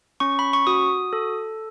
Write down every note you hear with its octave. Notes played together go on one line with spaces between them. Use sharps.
C#4 C#6
B5
C#6
F#4 D#6
A4